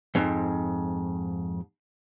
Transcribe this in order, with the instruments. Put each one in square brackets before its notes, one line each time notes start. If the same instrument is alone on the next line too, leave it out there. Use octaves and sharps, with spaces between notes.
[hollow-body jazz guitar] F2 G#2